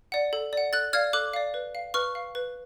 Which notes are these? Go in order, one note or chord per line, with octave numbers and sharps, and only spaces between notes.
D5 F#5
A4
D5 F#5
A4 F#6 A6
D5 F5 F6 G#6
A4 D6 F#6
D5 F5
B4
F5
B4 C#6 F6
F5
B4